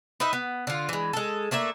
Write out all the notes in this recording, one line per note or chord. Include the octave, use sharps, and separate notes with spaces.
D#4 B4 D#5 E5
B3
D3 F4
E3 G#3
G#3 A4
A3 A#3 D4 E5